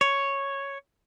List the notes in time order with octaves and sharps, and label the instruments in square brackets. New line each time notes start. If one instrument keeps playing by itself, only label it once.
[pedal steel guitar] C#5